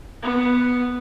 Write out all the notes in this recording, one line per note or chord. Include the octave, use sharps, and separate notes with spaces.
B3